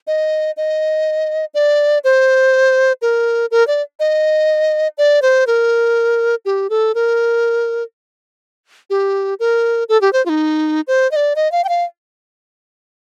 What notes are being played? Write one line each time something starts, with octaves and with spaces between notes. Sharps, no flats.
D#5
D#5
D5
C5
A#4
A#4
D5
D#5
D5
C5
A#4
G4
A4
A#4
G4
A#4
A4
G4
C5
F4
D#4
C5
D#5
D5
D#5
F5
G5
F5